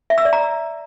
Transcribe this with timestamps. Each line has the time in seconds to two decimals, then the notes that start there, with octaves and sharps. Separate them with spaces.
0.10 E5
0.18 E6
0.25 D5
0.33 A#5